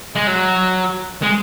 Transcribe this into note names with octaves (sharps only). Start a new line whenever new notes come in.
G#3
F#3
G#3